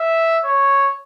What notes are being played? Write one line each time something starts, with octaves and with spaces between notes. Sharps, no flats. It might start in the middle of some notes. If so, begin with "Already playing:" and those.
Already playing: E5
C#5